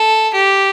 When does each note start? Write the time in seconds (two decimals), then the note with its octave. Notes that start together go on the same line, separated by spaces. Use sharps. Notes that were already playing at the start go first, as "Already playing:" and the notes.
Already playing: A4
0.34 G4